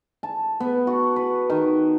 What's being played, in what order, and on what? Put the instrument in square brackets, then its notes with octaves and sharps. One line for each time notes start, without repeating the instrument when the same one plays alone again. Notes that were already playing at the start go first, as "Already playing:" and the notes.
[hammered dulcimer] A5
B3
F#4
B4
D#3